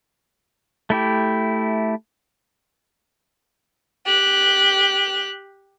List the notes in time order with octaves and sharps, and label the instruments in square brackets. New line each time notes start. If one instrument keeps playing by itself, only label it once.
[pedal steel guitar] A3 E4 G4
[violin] G4 F#6